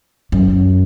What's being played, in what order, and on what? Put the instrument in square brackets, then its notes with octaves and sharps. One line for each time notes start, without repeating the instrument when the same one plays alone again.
[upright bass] F#2